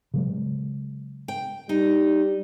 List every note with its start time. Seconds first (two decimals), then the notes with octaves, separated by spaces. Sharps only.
0.14 C#3 F#3 G#3
1.28 G5
1.69 G3 D#4